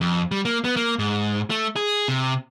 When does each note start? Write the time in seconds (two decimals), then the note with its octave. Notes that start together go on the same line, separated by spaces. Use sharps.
0.01 F2
0.31 G3
0.45 A#3
0.64 B3
0.76 A#3
0.99 G#2
1.50 A3
1.76 G#4
2.08 C3